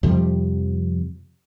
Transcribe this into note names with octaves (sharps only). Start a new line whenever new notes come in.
F2 C3 F3 G3